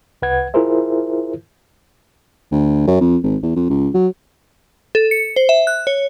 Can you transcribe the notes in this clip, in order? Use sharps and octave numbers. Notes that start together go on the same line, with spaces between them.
C2 B4 F#5 G#6
E4 F4 G#4 A#4 C5 E5
D2
F#2
F2
G#1
E2
F2
C#2
F#3
A4
C#7
C5
E5
F#6
C#5